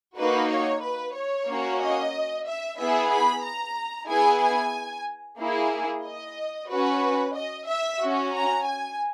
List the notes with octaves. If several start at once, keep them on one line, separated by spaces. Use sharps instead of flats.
A#3 D#4 F#4 B4
C#5
B4
C#5
A#3 C#4 F#4
D#5
E5
B3 E4 G#4 E5
B5
A#5
B3 E4 G#4 G#5
G#5
A#3 E4 G#4
D#5
C#4 F#4 B4
D#5
E5
C#4 F#4
A#5
G#5